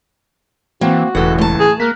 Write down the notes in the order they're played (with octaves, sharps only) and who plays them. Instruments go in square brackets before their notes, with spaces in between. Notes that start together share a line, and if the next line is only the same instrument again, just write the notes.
[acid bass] E3 [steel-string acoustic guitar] A#3 C4 [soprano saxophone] F#4
[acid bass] E1 [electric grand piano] C#2 A2 E3 [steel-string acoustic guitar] A4 F#5
[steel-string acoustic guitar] A3 A5
[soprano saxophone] G#4
[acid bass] A#3 [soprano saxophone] A#4 [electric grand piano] F6 F#6 B6